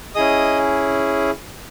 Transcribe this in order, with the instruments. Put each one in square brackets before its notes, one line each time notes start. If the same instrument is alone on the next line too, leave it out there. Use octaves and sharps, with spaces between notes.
[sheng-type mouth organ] C#4 E4 G#4 D#5 D#6